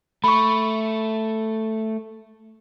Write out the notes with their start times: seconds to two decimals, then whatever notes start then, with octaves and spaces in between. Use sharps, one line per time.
0.24 A3 B5 C#6